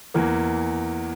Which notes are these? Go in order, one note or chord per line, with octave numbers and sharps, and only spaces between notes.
E2 E3 A#3